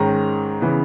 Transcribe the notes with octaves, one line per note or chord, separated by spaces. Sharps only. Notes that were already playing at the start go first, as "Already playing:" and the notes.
Already playing: G#2 D#3 G#3 C#4 A#5
C#3 E3 B3